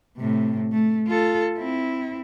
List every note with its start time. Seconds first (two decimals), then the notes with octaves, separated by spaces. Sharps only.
0.17 A2 C3
0.72 A3
1.07 F4 A4
1.57 C4 E4